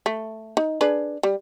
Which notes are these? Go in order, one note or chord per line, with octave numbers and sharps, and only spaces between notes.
A3
D#4
D4 G#4 B4
G3